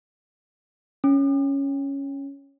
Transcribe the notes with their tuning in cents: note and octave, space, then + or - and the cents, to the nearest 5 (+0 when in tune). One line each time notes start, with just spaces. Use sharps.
C#4 +0